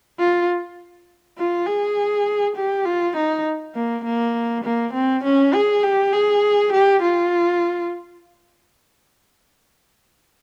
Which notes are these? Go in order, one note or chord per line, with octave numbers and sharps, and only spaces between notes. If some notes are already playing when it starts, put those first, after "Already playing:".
F4
F4
G#4
G4
F4
D#4
A#3
A#3
A#3
C4
C#4
G#4
G4
G#4
G4
F4